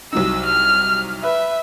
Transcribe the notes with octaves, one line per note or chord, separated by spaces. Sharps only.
C2 F#3 D#4 E6
F6
B4 E5